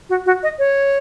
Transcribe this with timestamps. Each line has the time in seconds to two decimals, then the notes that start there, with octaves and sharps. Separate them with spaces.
0.10 F#4
0.26 F#4
0.43 D#5
0.59 C#5